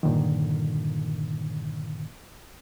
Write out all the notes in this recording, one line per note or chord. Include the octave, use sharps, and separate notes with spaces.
G2 A#2 D3 D#3